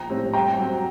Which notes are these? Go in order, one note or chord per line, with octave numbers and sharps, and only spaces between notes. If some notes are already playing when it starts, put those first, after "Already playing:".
Already playing: A#1 G5 A#5
A2 G3 C4
G2 G5 A#5
F#3 C4